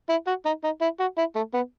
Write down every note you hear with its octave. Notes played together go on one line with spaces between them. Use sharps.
E4
F#4
D#4
D#4
E4
F#4
E4
A3
B3